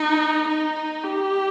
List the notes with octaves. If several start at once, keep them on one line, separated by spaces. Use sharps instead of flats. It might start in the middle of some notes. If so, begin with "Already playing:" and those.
Already playing: D#4
D#4
G4